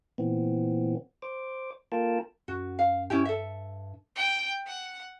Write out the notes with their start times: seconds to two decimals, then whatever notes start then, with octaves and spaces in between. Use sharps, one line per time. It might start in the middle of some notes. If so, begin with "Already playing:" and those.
0.18 A#2 E3 B3 C4
1.22 C5 D6
1.92 A#3 F4 A4 A#4 G5 A5
2.48 F#2 F#4
2.79 F5
3.10 G2 C#4 E4 G4
3.25 A4 E5
4.16 G5
4.66 F#5